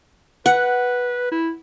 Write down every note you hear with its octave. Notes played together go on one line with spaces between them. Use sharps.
B4 F#5
E4